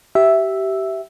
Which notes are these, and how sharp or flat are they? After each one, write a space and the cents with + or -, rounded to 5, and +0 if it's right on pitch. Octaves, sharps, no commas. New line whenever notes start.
G4 -25 E5 +0